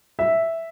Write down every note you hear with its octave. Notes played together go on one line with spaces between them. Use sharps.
E5